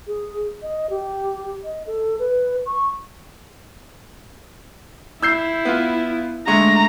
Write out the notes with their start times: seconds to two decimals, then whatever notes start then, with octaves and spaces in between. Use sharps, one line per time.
0.07 G#4
0.62 D#5
0.90 G4
1.64 D#5
1.87 A4
2.19 B4
2.66 C#6
5.22 E4 E6 G6 C7
5.65 B3 F4
6.47 D3 G#3 A3 A#5